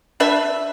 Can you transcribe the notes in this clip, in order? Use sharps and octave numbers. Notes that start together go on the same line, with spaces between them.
D4 B4 E5